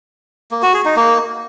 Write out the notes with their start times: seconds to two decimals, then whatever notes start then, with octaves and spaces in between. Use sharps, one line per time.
0.51 A#3
0.63 F#4
0.74 G#4
0.85 D#4
0.97 A#3